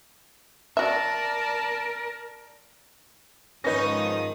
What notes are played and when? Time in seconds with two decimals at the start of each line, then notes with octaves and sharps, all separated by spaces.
0.77 F#4 A#4 D5 E5 A5
3.64 G#2 D#3 F3 C#4 D#4 B4 D#6 A#6